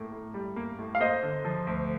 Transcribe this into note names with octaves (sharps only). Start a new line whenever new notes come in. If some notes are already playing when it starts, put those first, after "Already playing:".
Already playing: A2 A#3
A2
G3
A#3
A2
F5
A#3 C5 D#5
D3
F3
D2